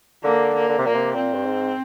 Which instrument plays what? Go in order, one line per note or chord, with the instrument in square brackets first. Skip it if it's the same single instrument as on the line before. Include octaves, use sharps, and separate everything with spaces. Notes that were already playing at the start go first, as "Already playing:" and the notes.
[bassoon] D3 [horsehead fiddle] A#3
[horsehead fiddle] A#3
[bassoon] D3
C3
[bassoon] A#2 [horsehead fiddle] A#3
[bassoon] C3
[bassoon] A#2 [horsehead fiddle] C4
[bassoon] G2
G#2